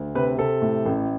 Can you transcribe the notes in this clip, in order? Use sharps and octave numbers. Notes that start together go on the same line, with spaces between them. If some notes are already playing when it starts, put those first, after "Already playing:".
Already playing: D2
C3 B4
C3 A4
A2
A1